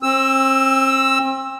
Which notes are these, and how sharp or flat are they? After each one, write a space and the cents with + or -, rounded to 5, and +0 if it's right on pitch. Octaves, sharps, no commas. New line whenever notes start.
C4 +35 E6 +0